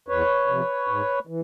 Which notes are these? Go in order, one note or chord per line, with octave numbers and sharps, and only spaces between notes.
E2 B4 C#5
C3 F3
G#2
E3